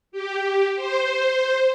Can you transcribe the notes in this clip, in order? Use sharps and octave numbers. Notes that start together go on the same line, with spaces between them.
G4
C5